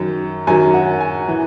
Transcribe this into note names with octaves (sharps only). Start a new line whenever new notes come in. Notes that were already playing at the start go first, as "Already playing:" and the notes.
Already playing: F#2 D#3 F#3
F#2 D#3 F#3 G#5
F#5
G#5
E3